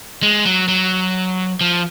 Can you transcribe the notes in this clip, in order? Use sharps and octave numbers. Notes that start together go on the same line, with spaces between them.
G#3
F#3
F#3
F3